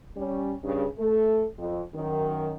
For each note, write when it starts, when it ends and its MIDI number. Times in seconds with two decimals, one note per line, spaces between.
0.17 0.54 55
0.17 0.54 61
0.64 0.85 43
0.64 0.85 49
0.99 1.45 57
0.99 1.45 69
1.58 1.81 41
1.95 2.57 42
1.95 2.57 51